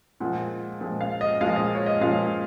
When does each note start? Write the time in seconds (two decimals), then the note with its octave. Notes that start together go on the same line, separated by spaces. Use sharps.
0.20 A#2 F3 G#3 F#5
0.81 A#2 F3 G#3
1.01 F5
1.21 D#5
1.41 A#2 F3 G#3 F5
1.56 D#5
1.75 C#5
1.86 D#5
2.01 A#2 F3 G#3 F5